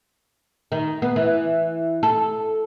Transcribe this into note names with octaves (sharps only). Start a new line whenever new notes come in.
D#3
B3
E3
A4